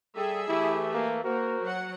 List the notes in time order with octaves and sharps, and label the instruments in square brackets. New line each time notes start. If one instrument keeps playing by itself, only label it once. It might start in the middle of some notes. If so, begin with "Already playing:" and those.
[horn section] G3 A4 [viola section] G#4 E5 [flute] G5
[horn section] E3 A3 [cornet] E4 [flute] G4
[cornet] A#3
[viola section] A#3 [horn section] F#4 [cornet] A#4 [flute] C5
[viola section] F#3 F#5